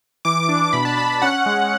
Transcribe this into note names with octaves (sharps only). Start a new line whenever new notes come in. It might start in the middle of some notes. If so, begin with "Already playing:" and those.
E3 D6
D4
B2 B5
A5
D4 B5
C#4 F#5
G#3